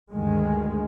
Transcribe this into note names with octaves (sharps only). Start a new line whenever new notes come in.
D2 G2 D#3 G#3